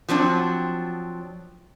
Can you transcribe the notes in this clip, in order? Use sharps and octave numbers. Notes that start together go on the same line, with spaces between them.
F3 F#3 C4 D4